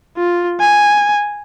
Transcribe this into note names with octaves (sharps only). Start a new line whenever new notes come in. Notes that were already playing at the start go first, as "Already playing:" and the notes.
F4
G#5